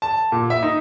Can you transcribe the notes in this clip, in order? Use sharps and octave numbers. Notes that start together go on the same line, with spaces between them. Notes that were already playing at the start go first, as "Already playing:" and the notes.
A5
A#2
E5
D#4